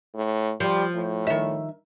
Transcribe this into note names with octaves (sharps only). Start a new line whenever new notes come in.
A2
F3 G3
A2
D#3 E5